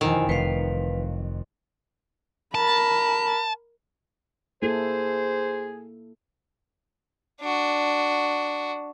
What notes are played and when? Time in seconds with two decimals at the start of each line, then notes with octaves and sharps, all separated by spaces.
0.01 E1 F2 B2 D#3 E4 C5 G#5
0.29 F1 F4 B4 F5 C7 C#7
2.55 A#4 A5 B5
4.62 A#3 E4 G#4 A4 C5
7.42 D4 F#4